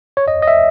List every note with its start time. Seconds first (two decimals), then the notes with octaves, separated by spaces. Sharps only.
0.17 C#5
0.28 D#5
0.42 D#5
0.48 E5